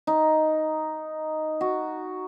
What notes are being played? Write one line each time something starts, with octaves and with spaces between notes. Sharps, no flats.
D#4
F#4